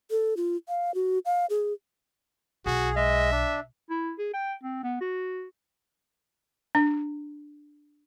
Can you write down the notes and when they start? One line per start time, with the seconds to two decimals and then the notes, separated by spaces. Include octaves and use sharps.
0.11 A4
0.37 F4
0.68 F5
0.95 F#4
1.26 F5
1.50 G#4
2.66 B1 F#4 G#4
2.96 G#3 D#5 E5
3.32 D4
3.90 E4
4.19 G#4
4.33 G5
4.63 C4
4.83 B3
5.01 F#4
6.75 D4